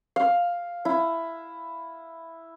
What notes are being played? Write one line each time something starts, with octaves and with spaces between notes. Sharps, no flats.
F5
E4